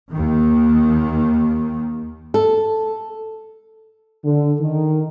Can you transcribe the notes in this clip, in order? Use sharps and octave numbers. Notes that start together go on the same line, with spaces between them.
D#2 D#3
A4
D3
D#3